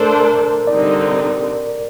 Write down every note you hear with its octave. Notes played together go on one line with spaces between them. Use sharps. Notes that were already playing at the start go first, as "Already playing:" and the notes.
Already playing: A3 D4 A4 A#4 C5
A#4
D3 G3 C4 D#4 D5